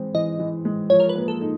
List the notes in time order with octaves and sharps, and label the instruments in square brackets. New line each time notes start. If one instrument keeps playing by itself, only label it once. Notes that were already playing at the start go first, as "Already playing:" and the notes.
Already playing: [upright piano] E3 G#3 C4
[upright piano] E3 [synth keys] D#5
[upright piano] E3
G#3
[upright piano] F3 [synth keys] C#5
[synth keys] A#4
B4
[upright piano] A#3
[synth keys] A4
[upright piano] D#4